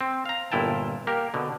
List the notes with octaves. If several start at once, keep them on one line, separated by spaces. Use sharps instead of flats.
C4
F5 A#5
G1 A#2 E4 G5 A5
A#3 G4 A#4
B2 D3